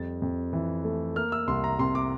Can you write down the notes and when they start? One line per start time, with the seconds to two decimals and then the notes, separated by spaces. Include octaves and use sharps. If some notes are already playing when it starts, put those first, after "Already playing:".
Already playing: F2 G3 A6
0.22 F2
0.53 E3
0.84 A3
1.16 A#3 F6
1.32 E6
1.48 C2 C6
1.64 A#5
1.79 C3 C6
1.95 D6